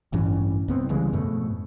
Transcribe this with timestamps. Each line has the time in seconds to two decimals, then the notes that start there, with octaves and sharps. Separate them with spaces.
0.13 A1 G2 E3 C#4
0.68 C2 B3 C4
0.89 C#3 E3 G3 G#3
1.13 F2 G#2 B2 A3